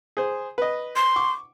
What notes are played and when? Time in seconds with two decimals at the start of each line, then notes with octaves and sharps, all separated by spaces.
0.17 G#4 C5
0.58 B4 D#5
0.96 C6
1.16 C#6 D6